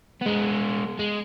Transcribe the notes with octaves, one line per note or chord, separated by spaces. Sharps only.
G#3 B3
G#3